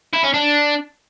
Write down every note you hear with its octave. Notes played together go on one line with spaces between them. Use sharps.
E4
C#4
D4